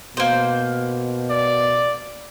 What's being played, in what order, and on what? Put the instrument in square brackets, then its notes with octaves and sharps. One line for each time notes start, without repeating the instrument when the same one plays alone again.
[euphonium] B2 [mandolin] A#3 C5
[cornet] D5